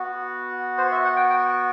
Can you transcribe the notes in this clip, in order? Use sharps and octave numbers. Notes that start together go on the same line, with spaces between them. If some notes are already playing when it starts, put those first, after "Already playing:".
Already playing: B3 F#4
C5
E5
F#5
G5
G5